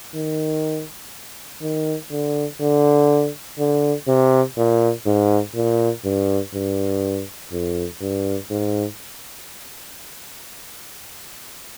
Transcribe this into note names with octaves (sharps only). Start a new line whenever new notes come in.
D#3
D#3
D3
D3
D3
C3
A#2
G#2
A#2
G2
G2
F2
G2
G#2